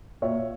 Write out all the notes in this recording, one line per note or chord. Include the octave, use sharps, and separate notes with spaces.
A#2 C#5 E5